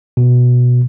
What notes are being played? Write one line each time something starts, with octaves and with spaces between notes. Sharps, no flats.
B2